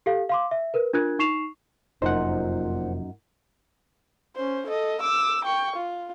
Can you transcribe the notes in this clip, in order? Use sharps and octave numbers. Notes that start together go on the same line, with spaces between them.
G4 A4 F5
F5 C6 D6
E5
A#4 B4
D4 F4 A#4 F#6 G#6
D#4 C#6 C7 E7 F7
F1 F#2 A#2 D#4 C5 F#5
C#4 C5
A4 D#5
D6 E6
G5 C#6
F4